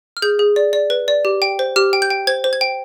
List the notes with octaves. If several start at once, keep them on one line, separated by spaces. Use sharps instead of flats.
F6
G#4 G6
G#4
D5
D5
B4
D5
G4
G5
C5
G4 F6
G5
G6
G5
C5 G#6
C5
G#6
G5